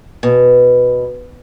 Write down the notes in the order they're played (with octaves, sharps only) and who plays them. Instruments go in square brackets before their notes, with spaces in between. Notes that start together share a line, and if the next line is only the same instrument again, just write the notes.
[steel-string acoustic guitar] B2